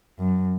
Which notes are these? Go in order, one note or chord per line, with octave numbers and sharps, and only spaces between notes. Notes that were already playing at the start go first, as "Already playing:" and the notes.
F#2